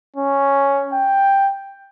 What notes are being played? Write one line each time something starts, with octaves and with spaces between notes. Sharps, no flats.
C#4
G5